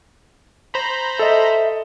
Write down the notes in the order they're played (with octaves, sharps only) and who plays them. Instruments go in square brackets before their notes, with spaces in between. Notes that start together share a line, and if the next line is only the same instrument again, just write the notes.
[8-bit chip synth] C5 A#5 B5
[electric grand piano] A4 D#5 [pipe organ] E5